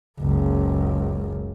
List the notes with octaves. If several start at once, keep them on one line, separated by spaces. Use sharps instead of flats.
F#1 C#2